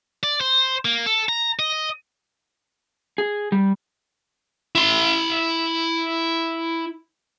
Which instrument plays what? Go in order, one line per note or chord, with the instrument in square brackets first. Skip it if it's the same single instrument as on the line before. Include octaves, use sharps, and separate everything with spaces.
[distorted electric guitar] D5
C5
A#3
A4
A#5
D#5
[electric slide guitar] G#4
G3
[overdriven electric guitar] E4 C6